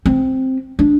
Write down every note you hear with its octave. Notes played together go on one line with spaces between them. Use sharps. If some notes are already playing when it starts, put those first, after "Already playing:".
C4
D4